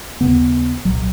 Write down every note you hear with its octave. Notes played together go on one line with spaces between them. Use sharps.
D#2 C#3 B3
C2 A#2 F#3